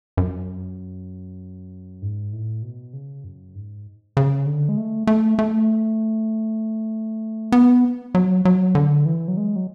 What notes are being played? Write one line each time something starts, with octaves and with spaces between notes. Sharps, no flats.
F#2
G#2
A2
B2
C#3
F#2
G#2
C#3
D3
G#3
A3
A3
A3
B3
F#3
F#3
D3
E3
F#3
G#3
F#3